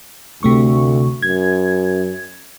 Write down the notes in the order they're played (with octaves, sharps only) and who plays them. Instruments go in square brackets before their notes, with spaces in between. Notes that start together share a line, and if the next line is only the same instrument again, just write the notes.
[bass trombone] D2 [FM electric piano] C3 A3 C#6
[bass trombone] F#2 [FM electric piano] G#6